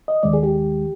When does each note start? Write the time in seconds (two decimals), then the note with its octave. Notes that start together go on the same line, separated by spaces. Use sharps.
0.08 D#5
0.23 D#2 D#3 G#3 D5
0.33 G#4
0.43 G4